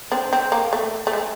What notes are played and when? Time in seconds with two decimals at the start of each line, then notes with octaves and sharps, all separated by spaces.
0.12 C4 D4
0.33 C4
0.52 A#3
0.73 A3
1.07 A3
1.13 G#3